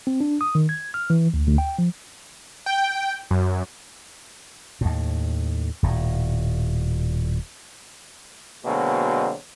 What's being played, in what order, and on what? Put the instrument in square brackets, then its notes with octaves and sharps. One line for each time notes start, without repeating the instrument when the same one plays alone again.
[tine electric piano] C4
D4
D#6
D#3
G#6
F6
E3
D2
D2
G5
F3
[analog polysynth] G5
F#2
[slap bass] D#2 A2
D#1 A2
[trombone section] B2 D3 F#3 G#3 A#3 C4